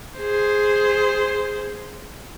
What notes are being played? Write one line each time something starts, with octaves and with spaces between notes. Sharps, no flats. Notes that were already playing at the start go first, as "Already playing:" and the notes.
G#4 C5